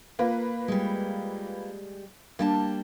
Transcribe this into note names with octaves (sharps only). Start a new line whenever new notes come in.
A#3 F4 B4
G3 G#3
G3 A#3 D4 A5